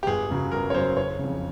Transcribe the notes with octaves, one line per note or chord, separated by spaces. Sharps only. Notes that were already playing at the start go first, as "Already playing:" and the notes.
G4
G1 G#4
F#2 C#3 F#3
G1 A#4
C#5
F#2 C#3 F#3 C5
F#1 C#5
F2 C#3